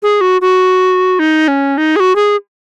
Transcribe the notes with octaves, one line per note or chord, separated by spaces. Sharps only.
G#4
F#4
F#4
D#4
C#4
D#4
G#4
F#4
G#4